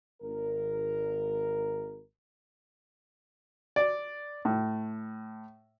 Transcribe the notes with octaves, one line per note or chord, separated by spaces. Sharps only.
G#1 A#4
D5
A2